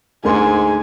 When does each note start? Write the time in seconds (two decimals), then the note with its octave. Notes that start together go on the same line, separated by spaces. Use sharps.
0.25 D2 G#2 A#4 G#5 C6